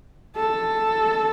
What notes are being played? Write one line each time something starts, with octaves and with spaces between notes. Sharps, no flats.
A4